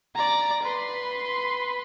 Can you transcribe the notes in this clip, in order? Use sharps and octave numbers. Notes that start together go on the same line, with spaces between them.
D5 A#5
B4 C6